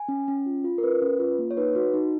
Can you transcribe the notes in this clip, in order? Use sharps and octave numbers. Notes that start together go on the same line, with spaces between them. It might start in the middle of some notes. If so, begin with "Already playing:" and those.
Already playing: G#5
C#4
C#4
F4
F4
A#4
C#4 B4
C#4
F4
A#3
C#5
D#4 B4
F#4
D#4